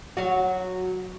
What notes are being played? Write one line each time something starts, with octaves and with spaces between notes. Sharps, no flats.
F#3 F#4